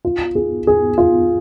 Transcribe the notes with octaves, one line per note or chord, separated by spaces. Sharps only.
F4
G#4
G#4
F4